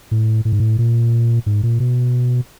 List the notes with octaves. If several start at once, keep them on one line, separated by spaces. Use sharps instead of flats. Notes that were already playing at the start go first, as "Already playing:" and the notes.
A2
A2
G#2
A2
A#2
G#2
A#2
B2